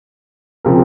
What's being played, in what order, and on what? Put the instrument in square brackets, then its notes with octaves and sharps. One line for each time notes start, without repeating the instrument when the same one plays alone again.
[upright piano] C#3 F3 C4 G4 A#4